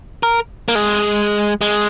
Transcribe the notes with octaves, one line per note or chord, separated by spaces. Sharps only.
A#4
A#3
G#3
G#3